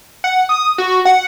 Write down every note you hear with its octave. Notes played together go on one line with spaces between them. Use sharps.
F#5
D#6
F#4
F#5